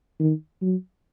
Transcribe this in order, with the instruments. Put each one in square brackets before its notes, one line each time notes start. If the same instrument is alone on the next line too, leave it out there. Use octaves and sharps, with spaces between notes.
[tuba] D#3
F#3